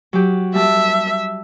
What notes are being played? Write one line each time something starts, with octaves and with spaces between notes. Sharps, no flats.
F#3 G4
G3 E5 A5